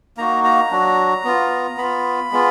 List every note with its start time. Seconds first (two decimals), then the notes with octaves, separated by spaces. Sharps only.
0.17 A#3 D#4 F#4 A#5
0.44 A#5
0.71 F#3 D4 F#4
1.24 B3 F4
1.77 B3 F4 B5
2.32 G#3 B3 F4